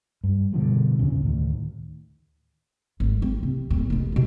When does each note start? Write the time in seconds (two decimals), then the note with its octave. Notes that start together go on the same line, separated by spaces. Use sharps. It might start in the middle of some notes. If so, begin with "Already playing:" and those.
0.24 G2
0.53 B2 D3 F3 G3
0.99 E2 A#2 C#3
1.22 D2 A2 D#3
3.00 G#1
3.22 C4
3.43 C3
3.70 D1 A#2
3.90 F1 D#3
4.12 B2 G#3